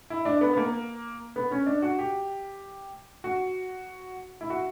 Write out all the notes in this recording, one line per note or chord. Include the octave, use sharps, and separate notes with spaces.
E4
D4
B3
B3
A#3
B3
C#4
D4
F#4
G4
F#4
E4
F#4